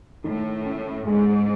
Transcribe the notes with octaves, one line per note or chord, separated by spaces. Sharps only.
A2 D#3
C#4
G#2 G#3